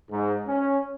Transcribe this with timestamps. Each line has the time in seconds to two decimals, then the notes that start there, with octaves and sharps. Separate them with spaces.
0.11 G#2
0.47 C#4